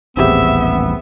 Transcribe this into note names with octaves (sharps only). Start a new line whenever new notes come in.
D#1 A1 B3 C4 G4 G#4 E5